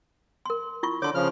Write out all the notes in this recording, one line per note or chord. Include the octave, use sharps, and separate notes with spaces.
A#4 C6
E4 F4 C#6
D3 C#5 C6 D6
C#3 F3 F6